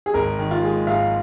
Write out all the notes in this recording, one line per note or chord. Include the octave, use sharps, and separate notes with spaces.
G#4
G#1 A#4
D#3
F4
G#3
G#2 F5